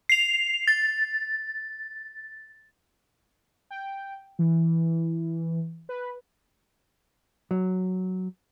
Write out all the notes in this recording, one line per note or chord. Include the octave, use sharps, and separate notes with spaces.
C7 F7
A6
G5
E3
B4
F#3